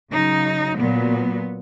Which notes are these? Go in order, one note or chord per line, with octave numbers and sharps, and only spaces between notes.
C#3 F#3 D#4
A#2 F#3 B3